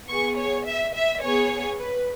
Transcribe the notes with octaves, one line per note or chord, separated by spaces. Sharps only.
B3 G#4 C#6
C#5
E5
E5
B3 G#4 C#5
B4